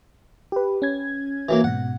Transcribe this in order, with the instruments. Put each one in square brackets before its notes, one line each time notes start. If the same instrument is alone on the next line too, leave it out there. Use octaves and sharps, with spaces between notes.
[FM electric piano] G4 B4
C#4 G#6
[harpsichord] E3 F#3 A#3
[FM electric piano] G#2 B2 [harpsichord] F#5